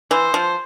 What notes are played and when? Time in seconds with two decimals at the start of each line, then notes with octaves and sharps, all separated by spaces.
0.11 E3 C5
0.34 F3